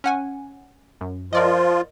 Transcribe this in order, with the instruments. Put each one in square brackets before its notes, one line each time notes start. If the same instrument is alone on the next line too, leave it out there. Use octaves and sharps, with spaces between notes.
[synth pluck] C#4 F#5 G#5
F#2
[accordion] F3 F4 [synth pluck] A#4 D5 D#5